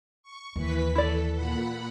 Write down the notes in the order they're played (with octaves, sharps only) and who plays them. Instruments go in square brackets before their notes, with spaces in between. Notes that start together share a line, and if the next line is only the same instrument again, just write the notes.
[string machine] C#6
[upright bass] D#2 [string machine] E3 B4 B6
[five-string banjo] E4 D5 [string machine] A4
[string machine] A#2 F#5 B5